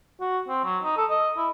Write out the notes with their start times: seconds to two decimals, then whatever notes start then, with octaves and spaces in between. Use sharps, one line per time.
0.20 F#4
0.49 C4
0.65 F#3
0.83 D#4
0.97 A4
1.10 D#5
1.37 E4